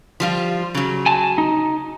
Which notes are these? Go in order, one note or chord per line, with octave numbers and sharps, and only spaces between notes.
F3 G3 F4
C#3 F#3
G#5 A5
D#4